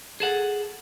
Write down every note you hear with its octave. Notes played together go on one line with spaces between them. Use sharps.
G#4 A4 F#5